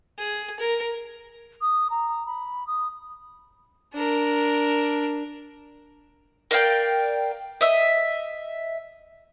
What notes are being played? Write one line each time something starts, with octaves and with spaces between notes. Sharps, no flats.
G#4
A#4
D#6
A#5
B5
D#6
D4 A#4
A#4 D5 F5 G5
D#5 E5